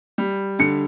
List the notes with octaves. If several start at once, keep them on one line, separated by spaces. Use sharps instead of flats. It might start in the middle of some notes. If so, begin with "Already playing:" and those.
G3
D3 C#7